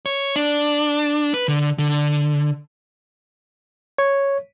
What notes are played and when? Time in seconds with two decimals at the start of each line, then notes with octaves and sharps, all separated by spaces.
0.06 C#5
0.36 D4
1.34 B4
1.48 D3
1.79 D3
3.98 C#5